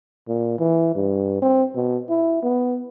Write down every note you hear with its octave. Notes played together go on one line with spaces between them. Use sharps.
A#2
E3
G2
C4
B2
E4
B3